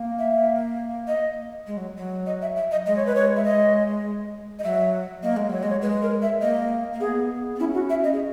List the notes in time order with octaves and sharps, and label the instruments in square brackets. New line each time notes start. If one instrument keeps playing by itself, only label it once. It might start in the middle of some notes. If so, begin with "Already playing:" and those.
Already playing: [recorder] A#3
[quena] E5
D#5
[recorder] G#3
F#3
F#3
[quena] D#5
E5
E5
D#5
[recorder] G#3 [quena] D#5
[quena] C#5
B4
C#5
E5
D#5
D#5
[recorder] F#3 [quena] E5
[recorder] A#3 [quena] D#5
[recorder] G#3
[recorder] F#3 [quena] C#5
[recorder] G#3 [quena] D#5
[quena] C#5
[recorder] G#3 [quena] B4
[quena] A#4
E5
[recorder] A#3 [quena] D#5
[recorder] A#3
[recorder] B3 [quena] G#4
[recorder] B3
[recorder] C#4 [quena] E4
[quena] F#4
E5
D#5
[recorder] G#4